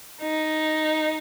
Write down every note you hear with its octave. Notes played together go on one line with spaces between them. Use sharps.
D#4